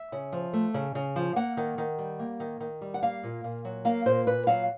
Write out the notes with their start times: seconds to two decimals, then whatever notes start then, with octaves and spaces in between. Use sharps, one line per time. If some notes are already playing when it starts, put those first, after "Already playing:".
Already playing: E5
0.12 C#3
0.32 F3
0.53 A3
0.74 C#3
0.95 C#3
1.16 F3
1.36 A#3 F#5
1.57 D#3
1.78 D#3
1.98 G3
2.19 A#3
2.40 D#3
2.60 D#3
2.81 G3
2.94 F#5
3.03 A#3 F5
3.23 A#2
3.44 A#2
3.65 F#3
3.85 A#3 F5
4.06 A#2 C5
4.27 A#2 B4
4.47 F#3 F5